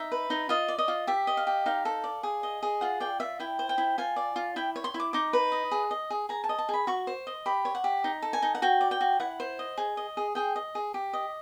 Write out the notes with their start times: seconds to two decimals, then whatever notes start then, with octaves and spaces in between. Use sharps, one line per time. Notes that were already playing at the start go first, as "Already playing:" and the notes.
Already playing: D#4 E5
0.12 B4
0.30 D#4
0.49 F4 D#5
0.68 D5
0.78 D#5
0.88 F4
1.07 G4 E5
1.27 D#5
1.37 F5
1.47 G4
1.66 D#4 F5
1.85 A4
2.04 D5
2.23 G#4
2.43 D#5
2.63 G#4
2.81 F4 F#5
3.00 D5 G5
3.20 F4 E5
3.40 E4 G5
3.59 C5
3.69 G5
3.78 E4
3.98 F4 G#5
4.16 D5
4.36 F4
4.56 E4 G5
4.76 C#5
4.84 C6
4.94 E4
5.00 D6
5.13 D#4 D6
5.33 B4
5.52 D#5
5.71 G#4
5.91 D#5
6.10 G#4
6.29 G#4 A#5
6.44 A5
6.49 D#5
6.58 A5
6.69 G#4 B5
6.87 F#4 C#6
7.07 C5
7.27 D#5
7.46 G4 B5
7.65 C#5
7.75 F#5
7.84 G4
8.04 D#4
8.22 A4
8.33 G#5
8.42 D#4
8.55 F#5
8.62 F#4 G5
8.81 D5
8.91 G5
9.01 F#4
9.20 E4 F#5
9.40 C5
9.59 D#5
9.78 G#4
9.97 D#5
10.17 G#4
10.35 G#4 G5
10.56 D#5
10.75 G#4
10.94 G4
11.13 D#5